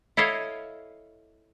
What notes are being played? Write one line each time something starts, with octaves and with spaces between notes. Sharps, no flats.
E4 A4 C#5 D#5 F5